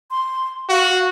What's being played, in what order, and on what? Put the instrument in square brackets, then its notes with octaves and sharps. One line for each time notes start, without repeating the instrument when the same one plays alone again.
[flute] C6
[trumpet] F#4 [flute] F5